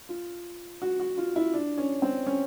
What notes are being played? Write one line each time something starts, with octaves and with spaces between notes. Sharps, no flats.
F4
F#4
F#4
F4
E4
D4
C#4
C4
C#4